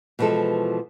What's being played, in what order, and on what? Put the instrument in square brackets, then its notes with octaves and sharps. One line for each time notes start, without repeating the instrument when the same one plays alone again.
[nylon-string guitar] B2 E3 F3 G#3 A4